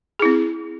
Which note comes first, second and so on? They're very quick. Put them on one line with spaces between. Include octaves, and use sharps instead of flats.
G#4 E4 C4